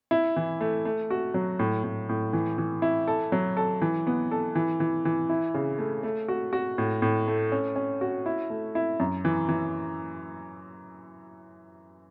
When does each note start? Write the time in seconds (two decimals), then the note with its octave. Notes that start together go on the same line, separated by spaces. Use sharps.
0.11 E4
0.36 E3
0.61 A3
0.85 A3
1.10 F#4
1.34 F#3
1.59 A2
1.84 A2
2.09 A2
2.33 E3
2.58 E3
2.82 E4
3.07 A4
3.32 F#3
3.57 A4
3.82 E3
4.07 B3
4.31 A4
4.55 E3
4.80 E3
5.05 E3
5.29 E4
5.54 C#3
5.79 A3
6.03 A3
6.28 F#4
6.53 F#4
6.78 A2
7.02 A2
7.28 A3
7.52 C#4
7.76 C#4
8.01 F#4
8.26 E4
8.50 A3
8.75 E4
9.00 F#2
9.25 E3
9.49 E3